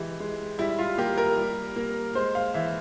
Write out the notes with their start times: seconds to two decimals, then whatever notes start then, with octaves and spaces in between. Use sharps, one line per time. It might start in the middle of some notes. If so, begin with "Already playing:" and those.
Already playing: E3 G#3 G4
0.20 G#3
0.59 G3 E4
0.79 F4
0.98 A#3 G4
1.18 A#4
1.37 G3
1.76 A#3
2.15 G#3 C5
2.35 F5
2.54 E3 E5